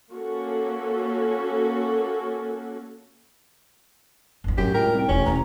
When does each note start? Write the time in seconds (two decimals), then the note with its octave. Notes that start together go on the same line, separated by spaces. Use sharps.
0.12 A#3 C#4 F#4 A4
4.44 G1 E2
4.58 F#2 A2 G4
4.74 C#2 A#4 G5
4.92 C2
5.09 E1 A1 C#4 F4
5.26 E1 A1 A3 A#5